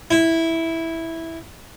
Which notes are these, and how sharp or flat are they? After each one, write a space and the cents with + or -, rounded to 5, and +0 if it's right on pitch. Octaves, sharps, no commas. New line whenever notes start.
E4 -5